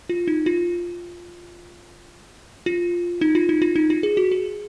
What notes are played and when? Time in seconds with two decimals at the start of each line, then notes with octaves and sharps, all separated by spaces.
0.09 F4
0.28 D#4
0.46 F4
2.66 F4
3.21 D#4
3.35 F4
3.49 D#4
3.62 F4
3.76 D#4
3.90 F4
4.03 G#4
4.17 F#4
4.32 G#4